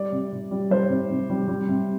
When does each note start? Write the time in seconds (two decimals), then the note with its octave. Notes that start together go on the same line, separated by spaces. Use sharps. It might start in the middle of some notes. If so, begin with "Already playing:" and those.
Already playing: G3 D5
0.12 C3
0.32 C3
0.51 G3
0.71 G3 C5
0.90 C3
1.10 C3
1.30 G3
1.48 G3
1.68 C3